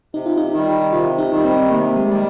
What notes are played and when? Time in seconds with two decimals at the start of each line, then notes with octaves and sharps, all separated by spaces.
0.14 C3 D#4
0.26 F4
0.37 D#4
0.53 D#3 G3
0.92 C3 F4
1.18 D#4
1.31 D#3 G3
1.44 C4
1.70 C3 A#3
1.96 G#3
2.09 D#3 G3